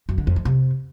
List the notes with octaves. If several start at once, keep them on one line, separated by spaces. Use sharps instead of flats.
F#2
D3
F2
F3
C3